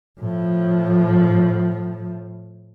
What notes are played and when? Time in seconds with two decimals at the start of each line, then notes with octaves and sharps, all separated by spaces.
0.20 A2 F3